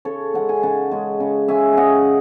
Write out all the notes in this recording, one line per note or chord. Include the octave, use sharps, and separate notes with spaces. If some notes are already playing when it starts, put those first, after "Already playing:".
C#3 A4 C#5
G#3 C#4 F#5
G#5
C#3 F#5 A5
G#3 C#4
C#3
G#3 C#4 E5 G#5
C#3 D#5 F#5 G#5